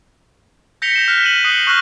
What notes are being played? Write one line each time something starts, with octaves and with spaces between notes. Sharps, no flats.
G6 A#6 B6 C#7 F7 G7
G6 B6 E7
F6 F#6 B6 C#7
D#7 F#7
D#6 F#6 C7 C#7 D#7
C#6 F6 F#6 A#6 G7